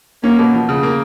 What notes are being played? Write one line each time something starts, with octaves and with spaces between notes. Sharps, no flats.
A#3 C#4
B2
F3
C#3
A#3